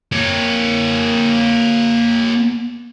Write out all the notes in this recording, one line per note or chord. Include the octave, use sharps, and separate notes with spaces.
A#3 C#5